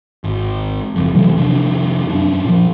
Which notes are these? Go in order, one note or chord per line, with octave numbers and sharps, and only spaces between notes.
G#1
F#1 F2
C3 E3 F#3 A3
F2 C3 D#3 D4
F#2 C#4 D4
A#2 F3